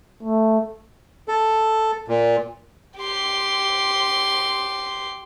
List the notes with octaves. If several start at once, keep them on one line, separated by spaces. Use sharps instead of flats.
A3
A4
A#2
G4 C6